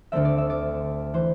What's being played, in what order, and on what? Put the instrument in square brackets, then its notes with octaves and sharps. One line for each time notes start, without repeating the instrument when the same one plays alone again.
[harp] D2 D3 A3 C4 E5
D5
E5
D5
E3 C5